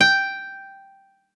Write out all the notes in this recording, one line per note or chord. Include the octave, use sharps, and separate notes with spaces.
G5